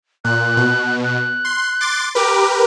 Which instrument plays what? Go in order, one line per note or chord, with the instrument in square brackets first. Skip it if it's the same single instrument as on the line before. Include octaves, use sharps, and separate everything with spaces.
[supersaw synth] A#2 [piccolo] F#6
[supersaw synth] B2
[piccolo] F#6
[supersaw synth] C6
C6 D6 A6
[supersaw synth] G4 A#4 B4 [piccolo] D6